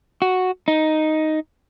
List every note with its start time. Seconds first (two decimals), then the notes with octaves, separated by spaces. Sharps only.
0.22 F#4
0.68 D#4